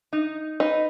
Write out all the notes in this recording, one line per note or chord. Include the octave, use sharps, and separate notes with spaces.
D#4
D#4 B4